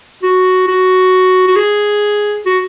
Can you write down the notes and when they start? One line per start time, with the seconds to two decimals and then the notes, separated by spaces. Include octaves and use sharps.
0.23 F#4
0.68 F#4
1.47 F#4
1.56 G#4
2.46 F#4